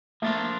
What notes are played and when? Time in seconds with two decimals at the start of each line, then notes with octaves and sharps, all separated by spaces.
0.22 F3 A3 A#3 D4 F4